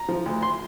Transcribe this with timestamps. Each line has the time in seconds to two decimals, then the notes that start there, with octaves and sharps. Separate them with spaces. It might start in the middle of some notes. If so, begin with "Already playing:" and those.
Already playing: A#5
0.09 F3
0.26 D2
0.42 C6